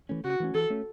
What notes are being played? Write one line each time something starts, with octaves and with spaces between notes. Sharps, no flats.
E3 A3 C#4
C#3 F#4
E3 A3 C#4
E3 A4
A3 C#4